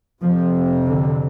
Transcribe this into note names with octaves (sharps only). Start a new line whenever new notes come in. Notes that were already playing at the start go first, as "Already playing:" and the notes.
F2 C3 F3
D3